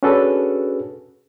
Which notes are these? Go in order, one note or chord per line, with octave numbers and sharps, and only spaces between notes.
C#4 D4 F#4 G#4 A4 B4